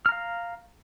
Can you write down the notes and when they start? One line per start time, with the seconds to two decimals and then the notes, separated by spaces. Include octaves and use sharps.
0.06 F6
0.09 A#5
0.12 F5